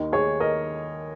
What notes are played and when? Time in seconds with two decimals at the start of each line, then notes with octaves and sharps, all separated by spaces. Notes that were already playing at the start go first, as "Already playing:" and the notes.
Already playing: D#2 D#3
0.13 G#4 C#5
0.40 A#4 D#5